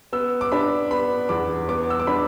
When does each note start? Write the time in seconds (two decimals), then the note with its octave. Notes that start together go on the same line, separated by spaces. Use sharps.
0.13 B3 E6
0.41 D6
0.52 D4 B5
0.91 B3 B5
1.29 E2 D6
1.68 B3 D6
1.90 E6
2.00 D6
2.07 D4 B5